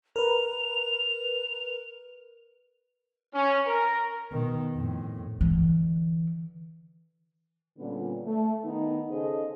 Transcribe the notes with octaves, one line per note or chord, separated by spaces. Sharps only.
A#4 B4 F7
C#4
A#4
B2 D#3
F2 A2
D3 E3
A#2 D3 G3 B3 C#4
A3
D#3 B3 D#4
C#3 G#4 A4 C5 D#5